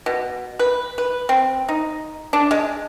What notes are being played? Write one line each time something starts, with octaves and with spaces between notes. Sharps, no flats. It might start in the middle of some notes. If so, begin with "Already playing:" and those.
B2
B4
B4
C4
D#4
D4
G#3